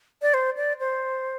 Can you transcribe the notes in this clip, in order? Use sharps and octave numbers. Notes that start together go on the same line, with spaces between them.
D5
C5
D5
C5